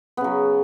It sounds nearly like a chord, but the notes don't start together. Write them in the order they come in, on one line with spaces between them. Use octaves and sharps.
B3 C#3 F#3